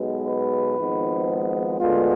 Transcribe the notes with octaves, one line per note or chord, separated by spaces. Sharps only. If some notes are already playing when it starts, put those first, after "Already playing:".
Already playing: B1 B2 G#3 B3
B4
G#1 G#2 F3 G#3 B3
D2 D3 G#3 B3 F4